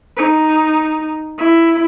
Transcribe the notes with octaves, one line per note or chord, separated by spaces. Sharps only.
D#4
E4